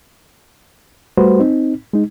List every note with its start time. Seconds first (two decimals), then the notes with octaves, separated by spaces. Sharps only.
1.18 G3 A3 F#4 B4 C5
1.40 C4 D#4
1.93 G#3 D#4